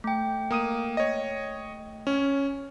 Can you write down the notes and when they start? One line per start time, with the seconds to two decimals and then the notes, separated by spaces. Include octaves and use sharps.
0.04 A3 G5
0.51 A#3 D#6 D#7
0.97 C#5 D#5
2.07 C#4